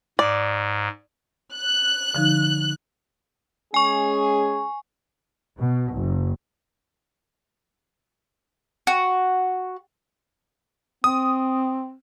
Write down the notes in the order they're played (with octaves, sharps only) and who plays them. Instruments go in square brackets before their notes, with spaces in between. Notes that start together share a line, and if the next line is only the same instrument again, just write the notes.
[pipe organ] G#2 [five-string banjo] D5
[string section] F#6
[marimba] D3 F3 D#4
[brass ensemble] G#3 C#4 G#4 [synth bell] G#5 C#6
[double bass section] B2
F#1
[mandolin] F#4
[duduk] C4 [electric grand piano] D#6